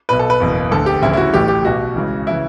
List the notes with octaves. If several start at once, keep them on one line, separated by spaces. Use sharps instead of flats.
B1 B2 B4
A4
B4
F#1 E2 B2
D2 D3 A4
G4
D2 C#3 E3 E4
E4
F#4
A1 A2 E3 G4
G4
B1 B2 F#4
C#2 C#3 E3
C#3 E3 E4